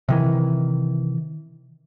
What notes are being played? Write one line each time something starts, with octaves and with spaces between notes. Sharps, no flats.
C3 D#3 E3